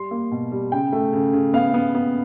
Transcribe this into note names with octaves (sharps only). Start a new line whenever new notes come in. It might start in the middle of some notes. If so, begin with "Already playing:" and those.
Already playing: G3 C6
A#3
B2
G3
C#3 G5
A3
C#3
C#3
B3 F5
B3
B3